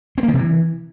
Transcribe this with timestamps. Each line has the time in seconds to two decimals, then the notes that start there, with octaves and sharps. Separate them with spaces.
0.18 C4
0.23 A#3
0.28 D#3
0.34 C3
0.39 E3